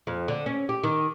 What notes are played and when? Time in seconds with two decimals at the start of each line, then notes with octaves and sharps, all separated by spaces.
0.07 F2
0.28 D3
0.46 C#4
0.69 G4
0.84 D#3